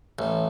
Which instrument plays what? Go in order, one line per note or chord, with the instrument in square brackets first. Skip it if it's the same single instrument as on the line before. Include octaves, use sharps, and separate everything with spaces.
[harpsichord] A1